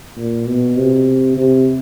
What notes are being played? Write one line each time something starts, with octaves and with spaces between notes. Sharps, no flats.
A#2
B2
C3
C3